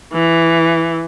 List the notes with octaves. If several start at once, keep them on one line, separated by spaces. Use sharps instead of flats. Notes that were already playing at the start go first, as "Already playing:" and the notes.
E3